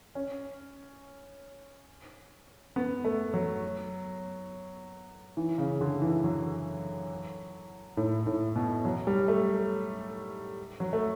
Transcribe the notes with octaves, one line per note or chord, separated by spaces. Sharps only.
C#4
B3
A3
F#3
E3
C#3
D3
E3
F#3
A2
A2
B2
F#3
G3
A3
F#3
A3